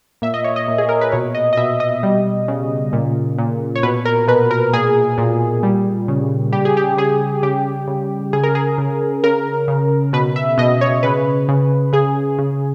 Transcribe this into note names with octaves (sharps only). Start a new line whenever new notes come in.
A#2 E5
D#5
C#5
D#5
A#2
G#4
A#4
B4
B2 C#5
D#5
D#5
B2 E5
D#5
G3
C#3
A#2
A#2
C#5
B2 B4
A#4
B2 B4
A#4
A#2 G#4
A#2
G3
C#3
G3 G4
G#4
G4
C#3 G#4
C#3 G4
C#3
C#3 G#4
A#4
G#4
C#3
C#3 A#4
C#3
B2 B4
E5
B2 D#5
C#5
C#3 B4
C#3
C#3 G#4
C#3